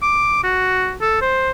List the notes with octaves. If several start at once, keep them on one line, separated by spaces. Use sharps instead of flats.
D6
F#4
A4
C5